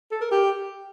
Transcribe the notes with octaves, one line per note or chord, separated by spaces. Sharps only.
A4
A#4
G4